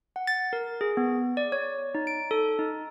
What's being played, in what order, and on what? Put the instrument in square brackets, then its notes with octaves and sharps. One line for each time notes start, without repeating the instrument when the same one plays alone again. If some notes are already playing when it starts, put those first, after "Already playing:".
[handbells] F#5
A6
A#4
G#4
B3
D5
C#5
D#4
D7
A4
D#4